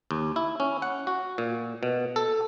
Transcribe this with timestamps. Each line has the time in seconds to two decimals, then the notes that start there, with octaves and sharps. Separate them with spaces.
0.11 D#2
0.36 E4
0.60 C#4
0.82 F#5
1.07 F#4
1.38 A#2
1.83 B2
2.16 A4